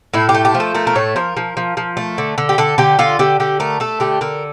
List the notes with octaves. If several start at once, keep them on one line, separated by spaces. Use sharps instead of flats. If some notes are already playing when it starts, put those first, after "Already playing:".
A2 E4
G4
A3
G4
F3
A4
A3 A#4
A#4
A2 C#5
F3 A#4
F3
F3
F3
A3
D3
D3
G4
D3 A4
D3 G4
D3 F4
D3 G4
D3 G4
A3 A#4
A3 A4
D3 G4
D3 A#4